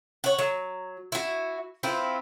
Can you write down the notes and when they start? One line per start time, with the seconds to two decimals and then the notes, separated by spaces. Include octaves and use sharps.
0.24 C#5 F#5
0.39 F#3
1.12 E4 F#4
1.83 C4 E4 F4 B4